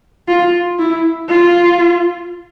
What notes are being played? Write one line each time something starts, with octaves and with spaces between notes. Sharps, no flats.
F4
E4
F4